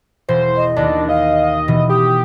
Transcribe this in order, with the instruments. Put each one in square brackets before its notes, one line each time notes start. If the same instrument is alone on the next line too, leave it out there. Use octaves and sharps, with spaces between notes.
[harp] E1 [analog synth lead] C5
[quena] D#5
[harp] D#2 [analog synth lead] D4
[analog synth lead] D#5 [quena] F5
[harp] B2 E3
[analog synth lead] G4 [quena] D#6